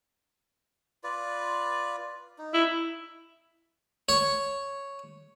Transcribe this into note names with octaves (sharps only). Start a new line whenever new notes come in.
F4 B4 D5
D#4
E4
C#5